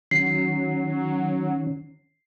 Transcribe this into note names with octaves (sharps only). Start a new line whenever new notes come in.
D#3 F#3 C#4 C7